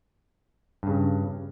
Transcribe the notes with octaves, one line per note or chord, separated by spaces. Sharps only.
G2 C#3